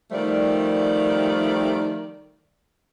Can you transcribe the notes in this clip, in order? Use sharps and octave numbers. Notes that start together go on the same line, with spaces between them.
D#3 F3 G3 A3 D5